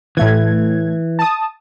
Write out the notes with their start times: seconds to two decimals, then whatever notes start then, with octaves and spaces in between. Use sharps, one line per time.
0.17 A2 E3 A3 G#6
1.19 A5 D#6